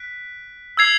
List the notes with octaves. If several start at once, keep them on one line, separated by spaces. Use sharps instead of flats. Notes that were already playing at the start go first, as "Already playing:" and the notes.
Already playing: F#6 B6 D7
E6 G#6 C7 F7